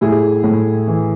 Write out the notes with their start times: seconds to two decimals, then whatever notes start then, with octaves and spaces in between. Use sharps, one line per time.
0.01 A2 E4 G#4
0.44 A2
0.87 E3